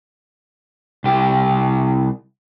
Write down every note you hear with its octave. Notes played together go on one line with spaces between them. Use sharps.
C2 G4